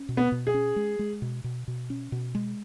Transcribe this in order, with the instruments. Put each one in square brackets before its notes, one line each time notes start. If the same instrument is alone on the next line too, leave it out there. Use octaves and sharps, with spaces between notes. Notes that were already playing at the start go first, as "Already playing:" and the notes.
Already playing: [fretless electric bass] C#4
B2
[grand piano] B3
[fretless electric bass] B2
[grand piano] G#4
[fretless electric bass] C#4
G#3
G#3
B2
B2
B2
C#4
B2
G#3